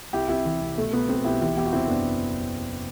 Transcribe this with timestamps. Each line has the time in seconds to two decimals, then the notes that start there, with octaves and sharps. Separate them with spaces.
0.13 C2 E4 G4
0.29 C3 E4 G4
0.45 E3
0.61 C2
0.77 B2 A3
0.93 B2 B3
1.09 B1 A3 C4
1.24 B1 E4 G4
1.41 E3 E4 G4
1.56 E2 E4 G4
1.65 F#4
1.73 C3 C4 E4
1.88 F#1 B3 D4